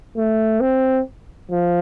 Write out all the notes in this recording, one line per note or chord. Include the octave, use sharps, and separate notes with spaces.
A3
C4
F3